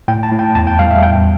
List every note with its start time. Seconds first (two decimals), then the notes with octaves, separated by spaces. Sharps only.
0.08 A2 G5
0.23 A5
0.31 A2
0.39 G5
0.55 E2 A5
0.67 G5
0.79 G3 F5
0.91 E5
1.03 E2 G5